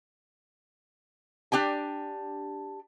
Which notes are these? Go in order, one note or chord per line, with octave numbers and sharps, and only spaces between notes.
D4 G4 G5 G#5